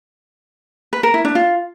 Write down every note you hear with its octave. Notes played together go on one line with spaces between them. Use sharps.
B4
A#4
E4
D4
F4